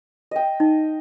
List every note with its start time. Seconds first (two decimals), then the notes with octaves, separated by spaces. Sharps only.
0.31 D#5 G5
0.60 D#4